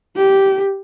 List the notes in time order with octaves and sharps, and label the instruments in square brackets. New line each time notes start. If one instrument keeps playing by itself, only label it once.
[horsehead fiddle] G4